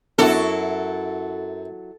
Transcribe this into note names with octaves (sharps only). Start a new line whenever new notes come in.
F#2 F#3 B3 D4 E4 F#4 A4 A#4